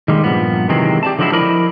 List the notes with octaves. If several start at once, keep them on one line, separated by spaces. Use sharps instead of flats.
D#3 G3 G#3 A#3
G2 A#2 F3 B3
C3 D#3 E3 F#3 G#3 C4
G4 D5 A5
D3 F3 F#3 G#3 C4 E4
F3 E4 A#4 D5 D#5 B5